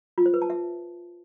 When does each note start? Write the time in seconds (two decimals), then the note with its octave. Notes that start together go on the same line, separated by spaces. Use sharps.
0.18 F4
0.26 C5
0.34 B4
0.42 A5
0.50 E5